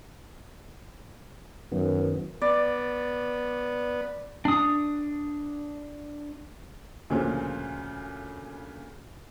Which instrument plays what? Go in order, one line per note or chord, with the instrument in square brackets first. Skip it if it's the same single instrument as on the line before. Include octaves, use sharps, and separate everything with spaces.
[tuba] F#2 [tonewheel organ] D#3 B3
[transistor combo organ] B3 [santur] D5
[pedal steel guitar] D4 D#6
[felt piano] D2 A#2 C#3 F3